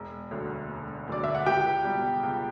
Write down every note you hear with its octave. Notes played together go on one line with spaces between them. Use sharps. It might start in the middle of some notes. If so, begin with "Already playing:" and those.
Already playing: E1
D2 D3 F#3
E1
D2 D3 F#3 D5
E5
F#5
C#2 G4 G5
B2 G3
C#2